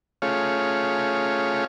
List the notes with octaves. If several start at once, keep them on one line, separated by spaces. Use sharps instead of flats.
A3 C#4 F4 G#4 C#5 F5